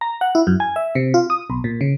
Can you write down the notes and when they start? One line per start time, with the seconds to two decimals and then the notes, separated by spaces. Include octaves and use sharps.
0.01 A#5
0.21 F#5
0.35 E4
0.47 F#2
0.60 G#5
0.76 E5
0.95 C3
1.14 F4
1.30 D#6
1.50 B1
1.64 A#2
1.81 C#3